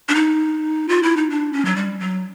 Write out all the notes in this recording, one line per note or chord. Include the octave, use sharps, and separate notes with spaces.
D4
D#4
F4
E4
D#4
D4
C#4
F#3
G3
F#3